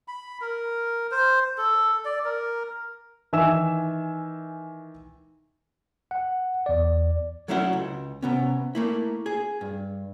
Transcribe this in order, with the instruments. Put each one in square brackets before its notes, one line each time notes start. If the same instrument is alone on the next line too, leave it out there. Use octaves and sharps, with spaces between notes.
[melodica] B5
A#4
C5
A4
D5
A#4
[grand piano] D#3 E3 E5 G#5 E6 E7
[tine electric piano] F#5
E2 D5
[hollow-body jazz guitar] F#3 A3 C#4 E4 B4 F#5
C#2
C3 B3 C#4
A3 A#3 E4
G#4
G2